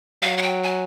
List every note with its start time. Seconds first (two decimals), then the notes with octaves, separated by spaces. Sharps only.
0.22 F#3 F5
0.37 F#5
0.42 G5
0.63 G#5